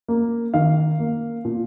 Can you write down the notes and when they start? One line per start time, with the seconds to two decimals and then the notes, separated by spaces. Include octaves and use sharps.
0.08 A#3
0.54 D#3 F5
0.99 A#3
1.45 A#2